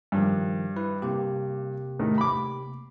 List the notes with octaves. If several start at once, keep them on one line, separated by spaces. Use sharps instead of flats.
G2 D#3 F3 G3
E4 B4
C3 A#3 G4
A2 D#3
B5 D6